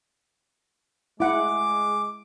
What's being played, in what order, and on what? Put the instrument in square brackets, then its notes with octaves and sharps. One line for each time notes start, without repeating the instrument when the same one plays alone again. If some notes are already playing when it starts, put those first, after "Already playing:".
[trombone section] G#3 [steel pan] E4 F#5 [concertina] D6